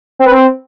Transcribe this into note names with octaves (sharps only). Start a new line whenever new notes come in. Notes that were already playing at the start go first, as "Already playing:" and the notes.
C4
B4
C4